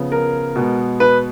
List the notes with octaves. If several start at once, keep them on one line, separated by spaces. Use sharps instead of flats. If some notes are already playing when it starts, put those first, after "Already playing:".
Already playing: C#3 F3 B3
A#4
B2 G#3 B3
B4